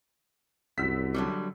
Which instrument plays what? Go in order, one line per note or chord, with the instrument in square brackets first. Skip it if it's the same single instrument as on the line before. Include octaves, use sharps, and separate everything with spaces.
[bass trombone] C2 [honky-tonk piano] F#2 E6 B6
[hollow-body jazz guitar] D3 F#3 G3